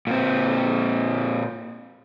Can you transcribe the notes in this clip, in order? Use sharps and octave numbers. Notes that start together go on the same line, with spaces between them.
A#2 C4